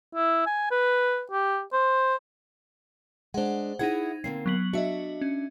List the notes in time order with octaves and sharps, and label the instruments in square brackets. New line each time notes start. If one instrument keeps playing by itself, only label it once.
[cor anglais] E4
G#5
B4
G4
C5
[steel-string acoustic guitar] G#3 D4 [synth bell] C5 F#5
[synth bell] D#4 G#6 [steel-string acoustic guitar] E4 G#4 F#5
[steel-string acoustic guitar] D3 A#3 C4 [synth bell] C7
[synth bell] F#3 B3 F#7
[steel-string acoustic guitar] D4 E5 [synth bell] F#4 D#5
[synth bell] C#4